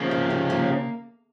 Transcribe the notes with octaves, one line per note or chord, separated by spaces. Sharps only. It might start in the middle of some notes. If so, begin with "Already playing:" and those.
Already playing: C#3 F3 A#3
C3
C3
A#3